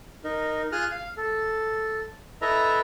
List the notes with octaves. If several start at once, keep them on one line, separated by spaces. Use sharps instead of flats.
D#4 A#4
F4 G#4 D#6 F6 F#6
F5
A4
E4 A4 B4 D#5 E5 A#5